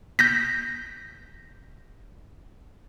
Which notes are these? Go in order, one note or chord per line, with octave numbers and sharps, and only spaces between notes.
G6 A#6 B6